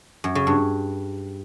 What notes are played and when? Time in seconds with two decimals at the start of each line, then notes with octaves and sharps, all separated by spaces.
0.24 F#2
0.35 C#3
0.47 G2